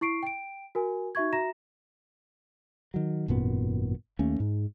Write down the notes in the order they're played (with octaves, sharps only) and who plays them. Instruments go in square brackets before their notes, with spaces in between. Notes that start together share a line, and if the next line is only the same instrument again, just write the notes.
[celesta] E4 C#6 C7 D7
G5 D7
F#4 A#4 G#5
D#4 F#4 E5 C#6 G#6
F#4 E5 A#5 A#6 E7
[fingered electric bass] D#3 F#3
G#1 F#2 A#2 B3
D#2 A3 A#3 C#4
G#2